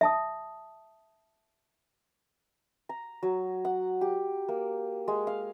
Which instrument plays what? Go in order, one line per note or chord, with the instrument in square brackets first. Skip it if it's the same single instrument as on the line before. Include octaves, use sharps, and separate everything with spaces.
[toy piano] E5 A5 D#6
[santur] A#5
F#3
F#5
G4
A#3
G#3
F5